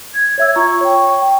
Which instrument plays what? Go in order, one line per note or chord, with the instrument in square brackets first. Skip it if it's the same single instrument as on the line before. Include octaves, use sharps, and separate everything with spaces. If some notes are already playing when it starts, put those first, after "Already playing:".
[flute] G#6
[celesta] C#5 E5 E6
[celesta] F4 A#5 [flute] C#6
[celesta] C#5 G5
G5